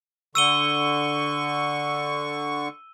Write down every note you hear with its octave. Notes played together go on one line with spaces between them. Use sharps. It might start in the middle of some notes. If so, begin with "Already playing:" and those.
D3 C#6 E6 D#7 G7